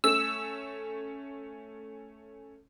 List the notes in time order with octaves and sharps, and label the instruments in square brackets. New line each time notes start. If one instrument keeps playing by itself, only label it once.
[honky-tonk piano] A3 C#4 [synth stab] E6